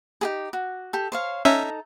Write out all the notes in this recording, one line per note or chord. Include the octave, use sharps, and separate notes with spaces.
D#4 G4 G#4
F#4
G4 A4
C5 C#5 F5
C#4 D#4 A4 E5 A#5